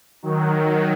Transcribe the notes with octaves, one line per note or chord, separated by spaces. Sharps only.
D#3 F#3
F#3